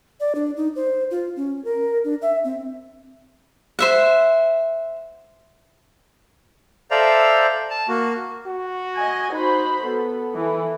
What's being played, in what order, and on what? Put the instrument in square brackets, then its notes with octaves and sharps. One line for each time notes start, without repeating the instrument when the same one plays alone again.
[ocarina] D5
D4
D#4
C5
F4
C#4
A#4
D4
E5
C4
[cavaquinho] C5 E5 F#5
[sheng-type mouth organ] A4 C5 D5 E5 F5 A#5
A5
A#3 F#4
[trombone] F#4
[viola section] D#5 G#5
[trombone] D#4 [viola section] F#4 C5 B5
[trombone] B3 [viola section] A4
[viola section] E3 A4